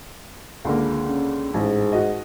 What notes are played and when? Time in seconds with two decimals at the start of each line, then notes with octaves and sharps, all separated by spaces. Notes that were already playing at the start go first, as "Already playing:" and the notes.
0.65 C#2 D3 A#3
1.10 C#4
1.54 A1 G#2
1.92 F#4 D#5